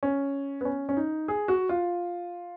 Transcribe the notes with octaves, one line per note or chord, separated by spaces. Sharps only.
C#4
B3
C#4
C#4
D#4
G#4
F#4
F4